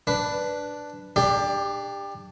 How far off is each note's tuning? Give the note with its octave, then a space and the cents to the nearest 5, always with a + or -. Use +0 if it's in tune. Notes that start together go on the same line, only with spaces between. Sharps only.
D4 +0 B4 +0
D4 +25 G4 +25 D5 -10